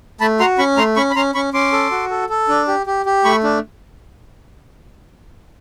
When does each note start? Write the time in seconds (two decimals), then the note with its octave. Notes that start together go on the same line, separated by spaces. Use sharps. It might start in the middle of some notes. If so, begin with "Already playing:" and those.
0.20 A3 A5 B5
0.40 F#4 A#5 C6
0.58 C#4 B5 C#6
0.77 A3 A#5 C6
0.96 C#4 B5 C#6
1.10 B5
1.16 C#4 A#5 C6
1.34 C#4 B5 C#6
1.54 C#4 C6 D6
1.72 A4
1.91 F#4
2.10 A4
2.29 A4
2.49 D4
2.68 G4
2.86 G4
3.06 G4
3.24 A3 B5 C#6
3.44 D4